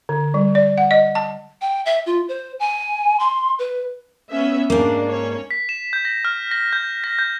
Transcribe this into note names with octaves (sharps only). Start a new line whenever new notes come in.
D3
G3
D5
F#5
D#5
A5
G5
E5
F4
C5
G#5
C6
B4
B3 C#4 E5
G#2 A#3 C#4 D4
C#4 C#5
B6
E7
G6
A#6
F6
A#6
G6
A#6
G6